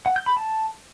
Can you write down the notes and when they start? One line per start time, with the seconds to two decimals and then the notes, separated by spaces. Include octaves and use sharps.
0.06 F#5
0.16 G6
0.26 B5
0.37 A5